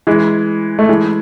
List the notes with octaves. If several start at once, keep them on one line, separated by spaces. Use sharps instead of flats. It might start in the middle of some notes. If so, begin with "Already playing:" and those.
E3 G#3
A3
E3 G#3